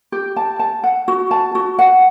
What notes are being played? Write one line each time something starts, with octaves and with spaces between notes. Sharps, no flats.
G4
A5
A5
F#5
F#4
A5
F#4
F#5